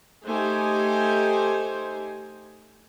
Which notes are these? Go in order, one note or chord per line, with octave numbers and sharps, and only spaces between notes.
A3 D#4 G4 C5 G#5